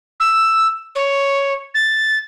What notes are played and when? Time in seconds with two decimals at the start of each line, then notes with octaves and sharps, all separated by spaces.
0.20 E6
0.95 C#5
1.74 A6